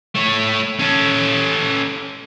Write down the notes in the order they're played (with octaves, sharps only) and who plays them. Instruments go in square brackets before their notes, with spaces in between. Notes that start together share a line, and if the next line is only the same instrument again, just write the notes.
[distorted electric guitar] A3 C#5
C#4 A4